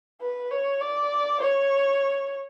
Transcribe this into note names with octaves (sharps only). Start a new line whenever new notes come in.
B4
C#5
D5
C#5